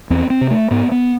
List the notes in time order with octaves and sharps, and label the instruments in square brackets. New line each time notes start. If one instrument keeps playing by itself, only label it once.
[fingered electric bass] E2 C4
C4
C3
A3
G#2 B3
B3